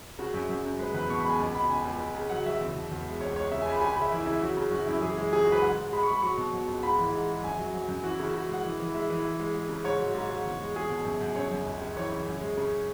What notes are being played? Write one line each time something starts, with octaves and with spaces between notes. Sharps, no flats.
C#3 F#4
F#2
F#2
F#2
G#3 B4
E2 B4
B2 C#6
B5
G#3 G#5
C#2
B2 B5
C#2 G#5
C#2
C#2
C#3
F#3 F#5
F#3 E5
E2
B2
E2
G#3
C#2 C#5
G#3 C#5
C#3 E5
G#5
C#2
B5
C#3 G#5
B5
C#3
E5
E3 E4
C#3 E4
F#3 F#4
C#3
F#2 F#4
F#2 E4
E3 G#4
G#3
C#3 G#4
F#4
C#2 B4
G#2 F#5
G#3
G#3 B5
C#6
G#3 B5
F#3 C#6
B2
F#3
C#2
G#2 B5
E3
G#2
G#3
F#2 G#5
F#3
F#3
F#2
E3 F#4
E4
C#3 F#4
C#3 F#4
G#3 F#5
E3
E3
G#3 E5
E3
E3
G#3
G#3
C#3
G#2 C#5
F#3
G#2
G#2
E2
G#3
G#3 G#4
B2
F#2
F#2
F#2 C#5
F#2
C#2
C#3
E3 C#5
C#3
F#2
G#3
C#3